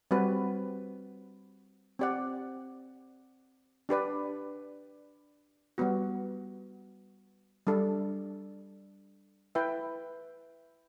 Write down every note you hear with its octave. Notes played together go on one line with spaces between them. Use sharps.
G3 C4 F#4 B4
C4 G4 D5 F#5
D4 G4 B4 D5
G3 B3 F#4
G3 D4 A4
E4 B4 E5 G5